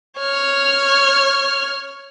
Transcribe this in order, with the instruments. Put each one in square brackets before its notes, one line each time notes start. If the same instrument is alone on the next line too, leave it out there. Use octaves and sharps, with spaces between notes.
[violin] C#5 F6